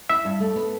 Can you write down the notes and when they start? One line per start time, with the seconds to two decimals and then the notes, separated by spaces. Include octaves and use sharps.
0.09 E4 E5
0.25 G2
0.40 A3
0.56 B3